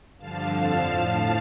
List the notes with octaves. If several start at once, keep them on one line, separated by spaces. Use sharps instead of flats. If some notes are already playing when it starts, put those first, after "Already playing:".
G2 D3 F3 F5 A5
F2 D3 F3
A2 F3